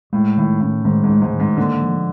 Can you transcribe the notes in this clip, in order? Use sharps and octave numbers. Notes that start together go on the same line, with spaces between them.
A2 G#3
A2 D#3
A2 C#4
G#2 D#3
G#2
G#3
G#2
D#3
G#2
D3 A#3
F3